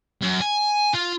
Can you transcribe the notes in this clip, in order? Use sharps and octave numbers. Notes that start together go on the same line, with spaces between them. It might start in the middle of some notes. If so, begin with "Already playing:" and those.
F#2
G#5
F4